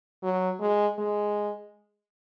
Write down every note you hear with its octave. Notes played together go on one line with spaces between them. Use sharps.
F#3
G#3
G#3